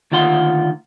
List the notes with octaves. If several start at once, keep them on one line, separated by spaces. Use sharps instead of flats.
D2 D#3 F4 F#5 C6